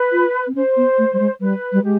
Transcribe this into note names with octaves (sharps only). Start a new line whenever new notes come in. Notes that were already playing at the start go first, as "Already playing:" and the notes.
Already playing: B4
F4
C4
C#4 C5
B3
A3
G3
G#3
G3 B4
G3
G#3 G4